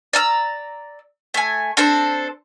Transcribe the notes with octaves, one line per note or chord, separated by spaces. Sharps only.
D5 A#5 E6
A3 G#5
C4 D4 A4 C5